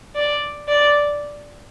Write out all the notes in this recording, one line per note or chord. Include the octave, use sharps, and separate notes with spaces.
D5
D5